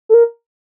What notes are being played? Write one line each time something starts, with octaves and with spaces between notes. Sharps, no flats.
A4
A#4